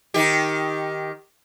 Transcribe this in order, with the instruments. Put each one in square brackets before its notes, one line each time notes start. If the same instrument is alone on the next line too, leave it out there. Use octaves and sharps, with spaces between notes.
[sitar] D#3 G4